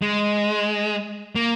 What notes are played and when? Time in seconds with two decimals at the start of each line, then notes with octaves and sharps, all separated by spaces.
0.02 G#3
1.35 A#3